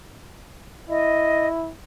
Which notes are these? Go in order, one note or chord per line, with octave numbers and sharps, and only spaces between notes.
E4 D#5